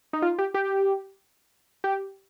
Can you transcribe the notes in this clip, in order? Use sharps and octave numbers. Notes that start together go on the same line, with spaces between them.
D#4
F4
G4
G4
G4